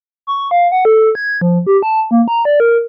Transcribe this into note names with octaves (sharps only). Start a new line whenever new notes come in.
C#6
F5
F#5
A4
G#6
F3
G4
A5
A#3
A#5
D5
A#4